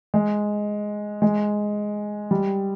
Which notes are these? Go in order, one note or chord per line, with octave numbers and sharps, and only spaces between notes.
G#3
G#3
G3